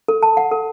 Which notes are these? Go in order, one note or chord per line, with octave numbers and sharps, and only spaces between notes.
A4
A5
F#5
A4